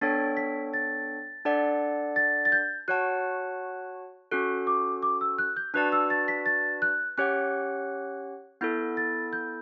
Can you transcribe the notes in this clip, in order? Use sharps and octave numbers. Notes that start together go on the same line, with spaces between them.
B3 D4 A4 C#5 G5 A6
B6
A6
D4 A4 D5 F#5
A6
A6
G6
F#4 C#5 F#5 A5 F#6
C#4 F#4 A4 F#6
D6
D6
E6
F#6
G6
D4 F#4 B4 D5 A5 F#6
E6
A6
B6
A6
F#6
C#4 G4 C#5 F#5 F#6
B3 E4 A4 G6
A6
G6